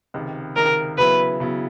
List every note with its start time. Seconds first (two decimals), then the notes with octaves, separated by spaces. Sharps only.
0.14 C#2 C3 D#3
0.56 C#2 C3 D#3 A#4
0.98 C#3 F#3 B3 E4 B4
1.40 C#3 F#3 B3 E4